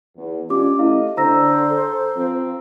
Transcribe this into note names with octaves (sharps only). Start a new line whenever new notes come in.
E2
G#3 C#4 D4 F4 G4 D6
A3 E4 D#5 F5
D3 C5 A#5 E6 A#6
A4
F3 C4